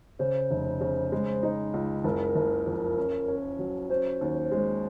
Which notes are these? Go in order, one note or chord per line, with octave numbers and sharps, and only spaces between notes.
C#3 C5
F1
C#3
G#3
D#4
C#2
F#1 A#4
F#1
F2
C#4
C#4
F#3
C#4 C5
D#2
G#3